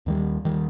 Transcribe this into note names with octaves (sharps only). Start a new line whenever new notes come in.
D#2 D#3 G3
D#2 D#3 G3